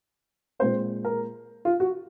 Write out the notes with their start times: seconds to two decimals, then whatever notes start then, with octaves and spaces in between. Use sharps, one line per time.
0.59 A#2 G#3 C4 C5
1.05 A#4
1.65 F4
1.80 F#4